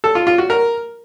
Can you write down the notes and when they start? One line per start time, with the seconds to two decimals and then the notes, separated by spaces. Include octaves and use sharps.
0.04 A4
0.15 F4
0.27 F4
0.38 F#4
0.50 A#4